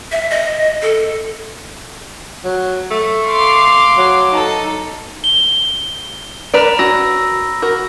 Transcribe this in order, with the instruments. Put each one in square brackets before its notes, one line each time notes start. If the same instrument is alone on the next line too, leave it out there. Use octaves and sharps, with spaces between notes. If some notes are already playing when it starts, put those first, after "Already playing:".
[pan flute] E5
D#5
A4
[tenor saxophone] F#3
A3
[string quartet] F5 C6 D6
[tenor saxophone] F#3
[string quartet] D#4 A4
[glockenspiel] G7
[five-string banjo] A#4 B4 D5 [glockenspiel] A#5 B5 D7
[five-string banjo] C#4 F#4 [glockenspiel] E6 A#6
[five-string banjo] F#4 A#4